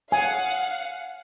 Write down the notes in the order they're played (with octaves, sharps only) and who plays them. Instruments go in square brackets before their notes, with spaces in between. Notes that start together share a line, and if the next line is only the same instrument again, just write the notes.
[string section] F5 F#5 [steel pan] G#5